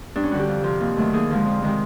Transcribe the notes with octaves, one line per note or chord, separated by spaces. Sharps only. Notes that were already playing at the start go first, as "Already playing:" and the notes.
G2 D4
C#4
D3 G3 F#4
G4
F2
C3 F3
D#2
D#3 F#3 A3
D#2 G#4
D3 F3 G#3
F2
C3 D#3 G#3